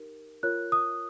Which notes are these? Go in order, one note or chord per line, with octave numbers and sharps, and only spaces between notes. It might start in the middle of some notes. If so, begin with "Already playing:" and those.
Already playing: D#4 G4 A#4
F4 A#4 C#5 F#6
D#6